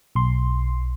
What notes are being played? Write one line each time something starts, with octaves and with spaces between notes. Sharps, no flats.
B1 C6